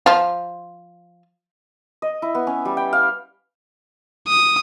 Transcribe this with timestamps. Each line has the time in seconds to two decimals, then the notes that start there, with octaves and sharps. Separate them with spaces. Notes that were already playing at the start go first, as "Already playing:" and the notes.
0.06 F3 F4
2.02 D#5
2.22 E4
2.35 B3
2.47 C#4
2.65 G3
2.77 G5
2.93 F5
4.28 D#6